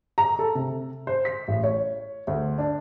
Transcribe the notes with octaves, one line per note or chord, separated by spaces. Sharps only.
A#5
A4
C3
C5
B6
A1
C#5
D2
D4